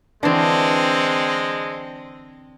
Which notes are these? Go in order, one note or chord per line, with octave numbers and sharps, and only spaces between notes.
D3 E3 G#3 C4 D4